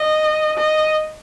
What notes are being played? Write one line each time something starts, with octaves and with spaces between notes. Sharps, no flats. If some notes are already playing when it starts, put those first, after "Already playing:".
Already playing: D#5
D#5